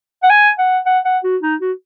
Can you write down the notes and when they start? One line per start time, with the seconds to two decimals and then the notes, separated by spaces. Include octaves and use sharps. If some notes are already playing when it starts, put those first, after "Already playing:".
0.23 F#5
0.30 G#5
0.59 F#5
0.86 F#5
1.05 F#5
1.24 F#4
1.42 D#4
1.61 F#4